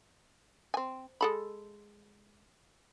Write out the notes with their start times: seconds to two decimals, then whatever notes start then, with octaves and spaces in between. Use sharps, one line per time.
0.74 C4 G#5
1.21 G#3 A4 B5